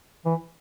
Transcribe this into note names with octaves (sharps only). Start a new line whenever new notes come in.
E3